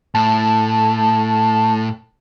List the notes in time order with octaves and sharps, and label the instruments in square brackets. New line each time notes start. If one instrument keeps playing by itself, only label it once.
[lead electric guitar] A2 [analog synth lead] A5